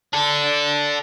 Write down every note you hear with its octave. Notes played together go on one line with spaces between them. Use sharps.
D4 A4